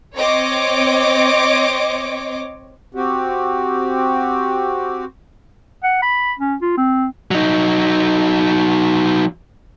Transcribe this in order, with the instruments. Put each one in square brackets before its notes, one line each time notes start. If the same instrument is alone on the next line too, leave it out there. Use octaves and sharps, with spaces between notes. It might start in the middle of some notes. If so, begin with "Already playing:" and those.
[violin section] C4 C#5 D#5 D6
[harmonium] C4 F#4 G4
[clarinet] F#5
B5
C#4
F4
C4
[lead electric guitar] F#3 D#4